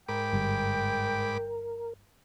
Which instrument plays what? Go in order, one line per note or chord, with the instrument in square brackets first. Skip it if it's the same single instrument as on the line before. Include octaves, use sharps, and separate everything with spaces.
[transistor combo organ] G#2 B5 D6 [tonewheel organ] A#4 [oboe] G5
[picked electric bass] G1 G3